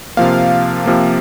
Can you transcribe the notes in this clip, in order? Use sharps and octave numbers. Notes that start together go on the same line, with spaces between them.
C3 F3 A#3 F5
C3 F3 A#3